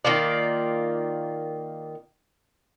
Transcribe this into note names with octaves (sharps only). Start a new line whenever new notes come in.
D#3 A#3 F4 D5